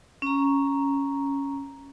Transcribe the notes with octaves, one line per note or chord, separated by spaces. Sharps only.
C#4 A#5